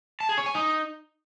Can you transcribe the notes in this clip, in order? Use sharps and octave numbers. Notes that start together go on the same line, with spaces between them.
A5
G#4
C#5
G#5
D#4